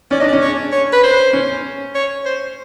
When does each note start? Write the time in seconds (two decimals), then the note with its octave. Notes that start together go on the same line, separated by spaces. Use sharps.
0.11 C#4 D5
0.20 D4 D#5
0.28 D5
0.33 C#4
0.42 C#5
0.72 C#5
0.92 B4
1.03 C5
1.33 C#4
1.95 C#5
2.26 C5